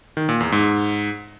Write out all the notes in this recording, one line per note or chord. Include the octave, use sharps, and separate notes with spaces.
D#3
A#2
E2
G#2